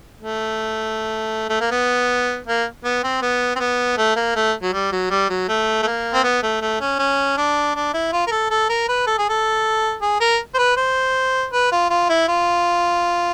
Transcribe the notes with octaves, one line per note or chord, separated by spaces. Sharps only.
A3
A3
A#3
B3
A#3
B3
C4
B3
C4
B3
A3
A#3
A3
F#3
G3
F#3
G3
F#3
A3
A3
A#3
C4
B3
A3
A3
C#4
C#4
D4
D4
E4
F4
A#4
A4
A4
A#4
B4
A4
G#4
A4
G#4
A#4
C5
B4
C5
B4
F4
F4
E4
F4